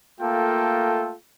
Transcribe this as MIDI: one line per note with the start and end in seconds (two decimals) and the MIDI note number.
0.21 1.15 57
0.21 1.15 58
0.21 1.15 65
0.21 1.15 69
0.21 1.15 79